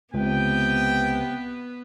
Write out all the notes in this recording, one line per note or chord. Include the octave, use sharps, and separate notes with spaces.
C#2 C3 B3 B4 G5